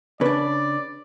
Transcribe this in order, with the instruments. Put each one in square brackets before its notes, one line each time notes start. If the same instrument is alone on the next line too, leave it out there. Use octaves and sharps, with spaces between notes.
[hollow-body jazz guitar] C#3 D4 [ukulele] B4 [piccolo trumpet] D5